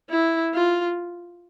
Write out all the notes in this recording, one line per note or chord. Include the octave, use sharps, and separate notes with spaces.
E4
F4